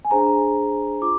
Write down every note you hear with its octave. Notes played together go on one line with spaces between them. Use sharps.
G#5
D4 G#4 C5 A#5
F4 D6